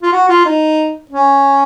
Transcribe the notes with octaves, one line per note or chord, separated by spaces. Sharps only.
F4
F#4
F4
D#4
C#4